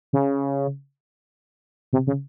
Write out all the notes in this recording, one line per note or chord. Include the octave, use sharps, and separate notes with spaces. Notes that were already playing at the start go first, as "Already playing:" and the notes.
C#3
C3
C#3